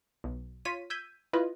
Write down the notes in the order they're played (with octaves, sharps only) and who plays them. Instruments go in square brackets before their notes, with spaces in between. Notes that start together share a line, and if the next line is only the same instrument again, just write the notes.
[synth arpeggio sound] B1
F4 C#5 B6 D#7
E6 G6 G#6 B6 D#7
E4 F4 B4 D#5